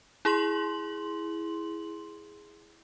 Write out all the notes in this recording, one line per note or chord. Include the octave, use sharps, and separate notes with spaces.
E4 G#4 C6 F#7